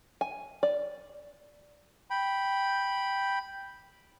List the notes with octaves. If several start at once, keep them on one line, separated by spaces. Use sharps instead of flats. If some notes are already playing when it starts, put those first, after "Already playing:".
G#5
D5
G5 B5